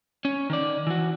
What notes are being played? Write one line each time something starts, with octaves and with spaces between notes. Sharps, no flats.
C#4
D#3 D5
E3 F#4